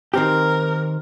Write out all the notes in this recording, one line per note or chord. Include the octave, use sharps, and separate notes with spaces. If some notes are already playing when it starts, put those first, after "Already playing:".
D#3 C4 G4 A#4